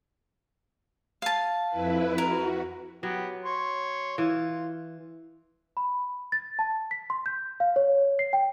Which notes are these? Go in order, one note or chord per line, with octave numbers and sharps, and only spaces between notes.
F5 A5
F2 E4 B4
F#4 A#4
F#3 B3 G4
C#5 C6
E3 F4
B5
A6
A5
B6
C6
G6
F5
C#5
C7
G5